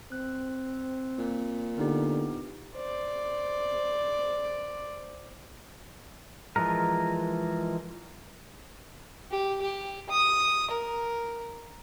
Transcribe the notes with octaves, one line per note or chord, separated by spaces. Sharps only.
C4 F#6
A#2
D3 B3 D#4 G4
C5 D5
E3 F3 G#3 A#4
G4
G4
D#6
A#4